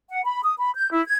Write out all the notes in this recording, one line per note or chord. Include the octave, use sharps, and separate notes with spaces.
F#5
B5
D#6
B5
G6
E4
G#6